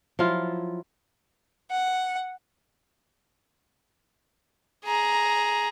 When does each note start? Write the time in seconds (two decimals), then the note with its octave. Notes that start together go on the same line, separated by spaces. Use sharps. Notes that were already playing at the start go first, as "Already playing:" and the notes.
0.19 F3 F#3 E4 F4
1.71 F#5
4.85 G#4 A#5